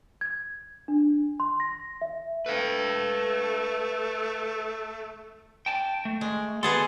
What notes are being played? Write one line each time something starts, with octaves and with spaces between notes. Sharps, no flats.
G#6
D4
C6
A#6
E5
A3 B4 F5
G5 A5
A3
G#3
B3 G#4 A4 D5 C6